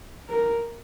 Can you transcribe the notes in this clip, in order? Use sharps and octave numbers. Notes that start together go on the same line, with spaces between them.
A#4